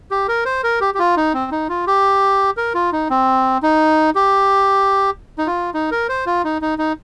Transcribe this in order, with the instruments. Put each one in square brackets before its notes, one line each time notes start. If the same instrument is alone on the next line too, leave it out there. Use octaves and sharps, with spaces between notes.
[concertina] G4
A#4
C5
A#4
G4
G4
F4
D#4
C4
D#4
F4
G4
A#4
F4
D#4
C4
D#4
G4
D#4
F4
D#4
A#4
C5
F4
D#4
D#4
D#4